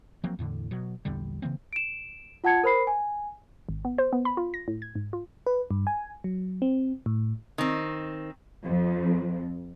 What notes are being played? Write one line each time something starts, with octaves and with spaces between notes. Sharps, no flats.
F3 F#3 A#3 C4
E2 A2 D3
B2 F#3
A#1 E2 D3 G3
C#3 E3 A#3 C4
D7 E7
F4 F#5 A5 G#6 C#7
A#4 C5 B5 C7
G#5
G#1
B3
C5
B3
B5
F4
A#6
A2
G#6
G#2
F4
B4
G2
G#5
F#3
C4
A2
D#3 C4
F2